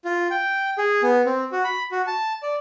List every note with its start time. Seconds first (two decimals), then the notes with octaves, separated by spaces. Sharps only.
0.05 F4
0.30 G5
0.78 G#4
1.03 B3
1.25 C4
1.52 F#4
1.64 B5
1.92 F#4
2.07 A5
2.43 D5